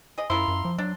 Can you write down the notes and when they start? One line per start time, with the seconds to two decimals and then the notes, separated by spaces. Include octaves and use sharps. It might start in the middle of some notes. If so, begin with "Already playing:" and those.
0.18 G#4 D#5
0.30 F#2 E4 F4 A#4 C6
0.48 F#2
0.65 F3
0.78 F#3 D4